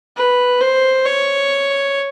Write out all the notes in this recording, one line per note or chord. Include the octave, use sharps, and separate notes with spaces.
B4
C5
C#5